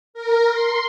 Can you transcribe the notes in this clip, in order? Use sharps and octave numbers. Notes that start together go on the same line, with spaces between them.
A#4
C6